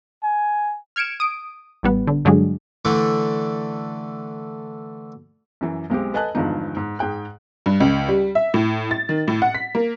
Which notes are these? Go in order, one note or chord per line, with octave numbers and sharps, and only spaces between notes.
G#5
F6 G#6 C#7 D7 E7
D#6 D7
A1 G3 B3
D3
G2 D3 F#3 G#3 D4
D3 E3 A3 D4
F#2 E3
B1 G#3 C4 G4
A4 B4 D#5 G#5 A5 F#6
E2 G2 D3 F3 G#3 D#4
G#2
G#2 G#4 G5 F#6
G2
C#2
G3
E5
A2
A6
D#3
A2
F#5
B6
A#3